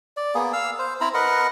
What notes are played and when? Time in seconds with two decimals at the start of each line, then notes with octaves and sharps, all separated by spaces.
0.17 D5
0.35 A#3 B3 G#4
0.53 F5 E6
0.79 C5
1.01 C4 E4 A#5 B5
1.14 A#4 B4 D#5 F#5